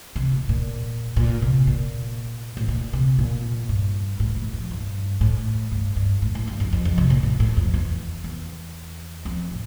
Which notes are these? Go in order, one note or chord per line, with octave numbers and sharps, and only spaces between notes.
C3
A#2
A#2
A#2
C3
A#2
A2
A#2
C3
A#2
G2
A2
A#2
F2
G2
A2
G2
G2
A2
A2
G2
F2
F2
F2
C3
A#2
A2
A2
F2
E2
E2
F2
A2